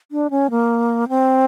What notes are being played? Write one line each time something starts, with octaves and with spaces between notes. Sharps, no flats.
D4
C#4
A#3
C4